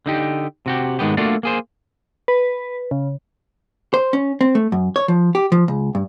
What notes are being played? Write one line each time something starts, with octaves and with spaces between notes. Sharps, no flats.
D3 D#4 G4
C3 F#4 G4
G#2 D#3 G#3 B3 G4
A3 A#3 D4 F4 F#4 D5
A#3 G#4 C5
B4
C#3
C5
C#4
C4
A3
F#2
C#5
F3
G4
F3
C#2
G2